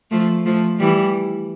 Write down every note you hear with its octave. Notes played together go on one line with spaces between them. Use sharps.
F3 A3
F3 A3
E3 G3